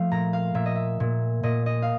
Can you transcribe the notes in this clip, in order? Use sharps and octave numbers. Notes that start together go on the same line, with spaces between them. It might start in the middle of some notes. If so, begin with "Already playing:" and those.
Already playing: F3 A3 F5
A#2 A#5
F5
A#2 E5
D#5
E5
A#2
A#2 D#5
D#5
F5